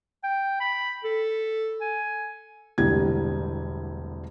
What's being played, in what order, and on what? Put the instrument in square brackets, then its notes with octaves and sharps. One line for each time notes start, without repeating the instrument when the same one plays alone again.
[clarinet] G5
B5
A4
G#5
[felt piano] E1 C2 A2 D3 G4 G#6